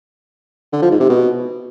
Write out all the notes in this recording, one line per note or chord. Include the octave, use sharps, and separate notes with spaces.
D3
F3
G#2
C3
B2